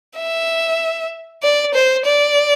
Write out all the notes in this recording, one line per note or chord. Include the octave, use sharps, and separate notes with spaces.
E5
D5
C5
D5